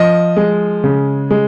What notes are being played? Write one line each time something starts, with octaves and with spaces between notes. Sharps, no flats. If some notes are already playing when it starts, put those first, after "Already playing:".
Already playing: F3 D#5
G#3
C#3
G#3